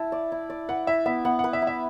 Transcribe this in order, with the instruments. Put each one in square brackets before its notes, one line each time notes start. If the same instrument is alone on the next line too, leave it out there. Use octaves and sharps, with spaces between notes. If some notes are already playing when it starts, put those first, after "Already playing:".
Already playing: [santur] E4 [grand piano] A5
[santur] D5
E4
D5
[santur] B4 [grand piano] F#5
[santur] E4 [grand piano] E5
[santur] B3 [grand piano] E5
[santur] B3 [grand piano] F#5
[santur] B4 [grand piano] F#5
[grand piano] E5
[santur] E4
[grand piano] E5